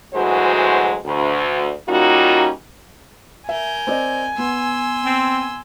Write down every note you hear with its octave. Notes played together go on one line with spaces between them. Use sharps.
D2 E3 F#3 G#3 F#4 C5
D2
G3 A#3 C#4 D#4 F4 F#4
A#4 E5 G#5 G6
C4 D5 D#5
B3 C6 E6
C4